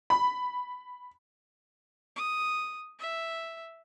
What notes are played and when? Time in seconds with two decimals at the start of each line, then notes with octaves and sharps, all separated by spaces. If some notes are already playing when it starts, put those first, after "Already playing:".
0.10 B5
2.16 D#6
2.99 E5